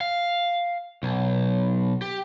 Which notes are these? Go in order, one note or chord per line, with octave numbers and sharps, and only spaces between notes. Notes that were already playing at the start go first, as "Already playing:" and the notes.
F5
B1
G4